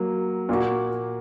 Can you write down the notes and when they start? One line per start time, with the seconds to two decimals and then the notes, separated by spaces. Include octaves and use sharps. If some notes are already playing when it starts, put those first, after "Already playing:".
Already playing: F#3 A#3
0.49 A#2 A#3 F#4